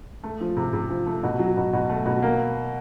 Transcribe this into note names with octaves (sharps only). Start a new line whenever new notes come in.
A3
F3
C3
C3
F3
A3
B2
F#3
B2
B2
A3
B2
A#3